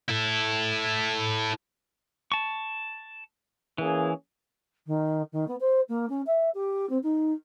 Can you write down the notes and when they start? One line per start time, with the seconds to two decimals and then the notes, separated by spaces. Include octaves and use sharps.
0.09 E4 A4
2.32 A5 C#6
3.78 E3 A#3 C#4 G#4
4.87 D#3
5.32 D#3
5.48 B3
5.60 C5
5.89 A#3
6.09 C#4
6.26 E5
6.54 G4
6.89 C4
7.03 D#4